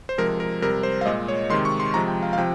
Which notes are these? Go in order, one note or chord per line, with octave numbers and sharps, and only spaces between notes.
C5
C3 F3 G#3 A#4
A#4
C3 G3 A#4
C5
F5
A#2 G#3 D#5
C#5
C3 D#3 G#3 C6
C#6
C6
C3 F3 G#3 A#5
G5
F5
F5
C3 F3 G5